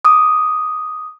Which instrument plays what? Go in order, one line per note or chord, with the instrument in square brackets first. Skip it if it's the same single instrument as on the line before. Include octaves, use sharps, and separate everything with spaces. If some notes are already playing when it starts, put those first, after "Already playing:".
[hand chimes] D6 D#6